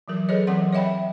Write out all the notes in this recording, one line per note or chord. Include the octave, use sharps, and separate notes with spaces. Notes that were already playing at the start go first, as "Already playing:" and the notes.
E3 F#3 A#4
G#4 A4 B4 C#5 D#5
E3 F#3 C4 A#4 F#5 C6
C#5 D#5 E5 G5 B5